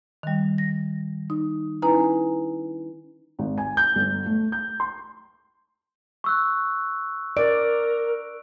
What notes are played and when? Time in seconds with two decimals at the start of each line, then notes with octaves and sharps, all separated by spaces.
0.23 D#3 G3
0.58 A#6
1.30 D#4
1.82 C#4 D#4 E4 B4 G#5 A#5
3.39 G#1
3.58 G#5
3.77 G6
3.95 G1
4.26 A3
4.52 G6
4.80 C6
6.24 C#6 E6 F#6
7.37 A#4 D5 D7